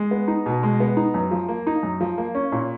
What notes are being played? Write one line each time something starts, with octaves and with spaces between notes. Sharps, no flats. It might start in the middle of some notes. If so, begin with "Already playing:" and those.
Already playing: G#3
B3
D#4
B2
G#3
B3
D#4
F#2
F3
A#3
D#4
F#2
F3
A#3
C#4
A#2